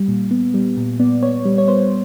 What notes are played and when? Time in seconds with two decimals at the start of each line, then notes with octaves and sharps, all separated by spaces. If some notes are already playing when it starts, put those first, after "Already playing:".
Already playing: G3
0.08 A#2
0.31 B3
0.54 G3
0.77 A#2
1.00 B3 D5
1.23 B3 C#5
1.45 G3
1.58 C#5
1.68 B3 C5